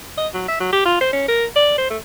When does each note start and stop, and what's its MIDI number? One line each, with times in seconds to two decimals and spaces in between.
0.18 0.28 75
0.34 0.45 54
0.48 0.56 76
0.61 0.70 54
0.73 0.84 67
0.86 0.97 65
1.01 1.09 72
1.13 1.26 61
1.29 1.45 70
1.56 1.76 74
1.78 1.90 72
1.90 1.98 57